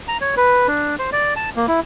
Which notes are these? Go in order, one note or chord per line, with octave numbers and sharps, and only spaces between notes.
A#5
C#5
B4
D4
C5
D5
A5
A#3
E4